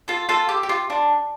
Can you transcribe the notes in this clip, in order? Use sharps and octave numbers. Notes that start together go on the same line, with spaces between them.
F4 A4
F4 A4
G4
G4
F4
D4